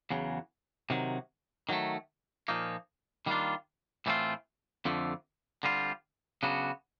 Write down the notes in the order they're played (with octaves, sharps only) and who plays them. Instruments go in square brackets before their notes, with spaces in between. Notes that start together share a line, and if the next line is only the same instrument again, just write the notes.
[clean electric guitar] E2 C#3 F#3
C3 D#3 F#3
D#3 F#3 A3
A#2 F3 A#3 D#4
D#3 G3 A#3 D4 F4
A2 E3 A3 C4 F4
F2 D3 F3 A3
D3 G3 C4 F4
C#3 F#3 B3 D4 F#4